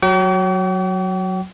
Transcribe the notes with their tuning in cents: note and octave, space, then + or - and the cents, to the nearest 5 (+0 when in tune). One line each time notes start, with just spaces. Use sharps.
F#3 +0 G5 -45 D6 -45